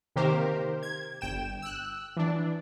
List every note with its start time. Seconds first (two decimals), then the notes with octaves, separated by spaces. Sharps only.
0.16 C3 D#3 A#3 G4 A#4 C5
0.83 G#6
1.21 G1 G5 E7
1.62 E6 F#6
2.17 E3 D4